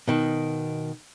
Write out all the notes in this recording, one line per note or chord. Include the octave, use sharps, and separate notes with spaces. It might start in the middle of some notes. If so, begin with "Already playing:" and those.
B2 D#3